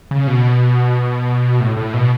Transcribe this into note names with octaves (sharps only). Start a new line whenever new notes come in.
C#3
B2
A2
A2
B2